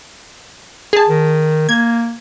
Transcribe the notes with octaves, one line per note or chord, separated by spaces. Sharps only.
G#4 A5
D#3
A#3 G#6